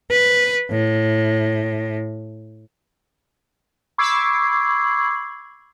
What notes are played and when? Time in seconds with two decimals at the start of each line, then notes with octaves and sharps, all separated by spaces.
0.11 B4
0.71 A2
3.98 B5 C#6 D6 E6 G#6 C7